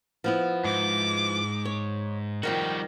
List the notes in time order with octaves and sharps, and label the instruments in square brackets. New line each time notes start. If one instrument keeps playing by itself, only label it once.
[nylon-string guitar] F3 B3 E4
[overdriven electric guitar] G#2 [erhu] D6
[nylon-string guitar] C#5
[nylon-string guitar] F2 G#2 D#3 [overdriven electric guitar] G3 F#4 [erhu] G5